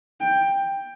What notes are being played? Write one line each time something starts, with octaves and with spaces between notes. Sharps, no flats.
G5